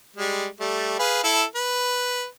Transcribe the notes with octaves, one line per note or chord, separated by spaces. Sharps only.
G3 G#3
G3 A3
G#4 B4 F5
E4 A4
B4